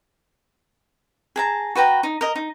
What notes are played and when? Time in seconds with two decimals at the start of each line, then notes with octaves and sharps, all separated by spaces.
1.36 G#4 A5 A#5
1.75 F#4 B4 G5 A#5
2.03 D#4
2.21 A#4 D#5
2.35 D#4